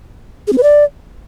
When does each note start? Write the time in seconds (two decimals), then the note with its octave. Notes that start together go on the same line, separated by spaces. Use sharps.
0.47 G#4
0.53 C4
0.58 B4
0.63 D5